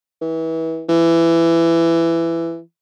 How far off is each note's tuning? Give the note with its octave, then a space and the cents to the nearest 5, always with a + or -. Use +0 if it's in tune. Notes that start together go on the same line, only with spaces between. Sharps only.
E3 -30
E3 +15